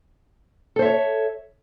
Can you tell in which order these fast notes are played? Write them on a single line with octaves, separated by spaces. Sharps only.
A4 C5 E5 C#5